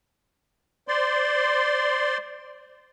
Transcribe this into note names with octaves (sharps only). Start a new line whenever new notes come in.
C5 D5 C6